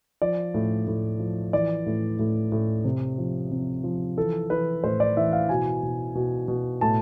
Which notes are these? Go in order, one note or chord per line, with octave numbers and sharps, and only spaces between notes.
F3 D5
A2
A2
F3
E3 D5
A2
A2
A2
C3
F3
C3
F3
E3 A4
E3 B4
A2 C5
D5
E3 E5
F5
B2 G#5
B2
B2
B2
A2 A5